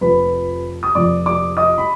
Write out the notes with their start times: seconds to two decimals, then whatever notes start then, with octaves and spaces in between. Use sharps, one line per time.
0.01 F1 F2 F3 B4 B5
0.83 D#6
0.95 F1 F2 F3 D5 D6
1.26 D5 D6
1.57 D#5 D#6
1.78 B5